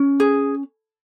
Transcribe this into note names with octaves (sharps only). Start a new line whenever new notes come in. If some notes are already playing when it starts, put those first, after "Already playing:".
Already playing: C#4
G#4